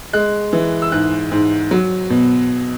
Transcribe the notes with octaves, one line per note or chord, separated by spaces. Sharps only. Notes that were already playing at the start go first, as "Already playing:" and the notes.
G#3 F#6
E3
E6
G#2 F#6
G#2
F#3
B2